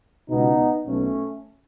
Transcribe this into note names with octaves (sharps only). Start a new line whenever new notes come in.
C#2 B2 B3 D#4
B1 B2 A3 C#4